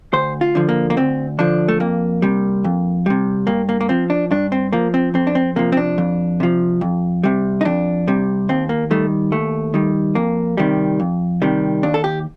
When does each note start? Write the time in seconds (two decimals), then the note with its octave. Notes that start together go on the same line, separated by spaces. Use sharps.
0.13 D2 C5
0.41 F4
0.55 D3 F3
0.69 A#3
0.90 A#3
0.97 D2 C4
1.39 D3 F3 D4
1.68 A3
1.80 F2 A#3
2.22 C3 G3
2.64 F2
3.06 C3 G3
3.47 G2 A#3
3.69 A#3
3.81 A#3
3.89 F3 C4
4.10 D4
4.31 G2 D4
4.52 C4
4.73 F3 A#3
4.94 C4
5.14 F2 C4
5.27 D4
5.35 C4
5.56 C3 F3 A#3
5.72 C4
5.77 D4
5.98 F2
6.40 C3 F3
6.81 F2
7.24 C3 G3
7.61 D#4
7.65 F2 D4
8.08 C3 G3
8.49 D#2 C4
8.69 A#3
8.91 D#3 G3 A3
9.32 D#2 A3
9.74 D#3 G3
10.15 F2 A#3
10.57 C3 D#3 G3
11.00 F2
11.42 C3 D#3 G3
11.83 D#2 D4
11.94 A4
12.04 G4